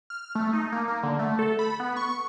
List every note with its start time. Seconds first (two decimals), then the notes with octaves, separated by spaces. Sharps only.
0.10 F6
0.35 A3
0.53 D#4
0.72 A#3
0.88 A#3
1.03 D3
1.19 A3
1.39 A4
1.59 B5
1.80 B3
1.96 C#6